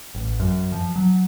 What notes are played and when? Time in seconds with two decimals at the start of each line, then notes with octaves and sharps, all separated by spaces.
0.15 A1
0.40 F#2
0.72 F3
0.96 F#3